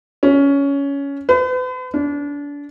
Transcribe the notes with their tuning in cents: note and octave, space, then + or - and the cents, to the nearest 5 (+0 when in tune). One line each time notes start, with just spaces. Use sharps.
C#4 +15
B4 +45
D4 -30